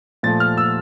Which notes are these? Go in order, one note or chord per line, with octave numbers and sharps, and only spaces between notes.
A#2 F3 A3 A6
F6
E6